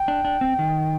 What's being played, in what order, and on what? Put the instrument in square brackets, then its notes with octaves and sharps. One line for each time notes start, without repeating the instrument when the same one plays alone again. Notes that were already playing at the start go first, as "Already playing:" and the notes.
Already playing: [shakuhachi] G5
[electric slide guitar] D4
D4
C4
D#3